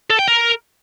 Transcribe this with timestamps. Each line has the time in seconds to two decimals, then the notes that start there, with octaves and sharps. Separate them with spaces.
0.10 A4
0.19 G5
0.28 A#4